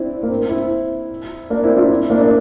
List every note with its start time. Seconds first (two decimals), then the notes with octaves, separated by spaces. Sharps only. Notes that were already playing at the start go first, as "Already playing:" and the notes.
Already playing: C4 D4 E4
0.23 A#3
0.29 C4
0.49 C4 E4
1.50 A#3 D4
1.64 C4 E4
1.77 D4 F4
1.89 C4 E4
2.10 A#3 D4
2.21 D4